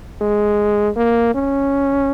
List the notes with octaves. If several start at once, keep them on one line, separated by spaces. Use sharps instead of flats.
G#3
A#3
C#4